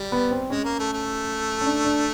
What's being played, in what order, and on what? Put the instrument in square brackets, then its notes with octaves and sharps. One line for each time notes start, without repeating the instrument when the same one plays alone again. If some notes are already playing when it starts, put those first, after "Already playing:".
Already playing: [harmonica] G3
[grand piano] B3
C4
[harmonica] G#3 [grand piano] C#4
[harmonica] A#3
A3
A3
[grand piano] C#4
D4
D4